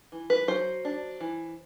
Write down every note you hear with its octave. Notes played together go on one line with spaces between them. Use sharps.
E3
B4
F#3 C5
D4
E3